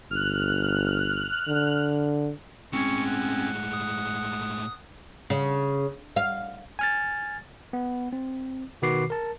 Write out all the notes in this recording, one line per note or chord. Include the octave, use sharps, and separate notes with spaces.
G1 F6 F#6
D3
A2 G#3 C4 C#4 C#6 G#6
F#5
D#6
C#3
F5
G#5 F6 A6
B3
C4
B2 D#3 F#4 B4 D6 C7
A#4 A5